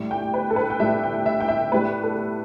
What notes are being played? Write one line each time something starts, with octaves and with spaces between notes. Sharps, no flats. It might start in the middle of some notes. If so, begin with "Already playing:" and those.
Already playing: A2 G3
G5
B4
A4
B4
G5
A2 G3 E5
G5
E5
G5
E5
A2 G3 B4
A4